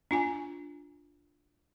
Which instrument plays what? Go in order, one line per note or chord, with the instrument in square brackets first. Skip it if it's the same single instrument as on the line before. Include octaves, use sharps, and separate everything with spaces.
[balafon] D4 F4 G#5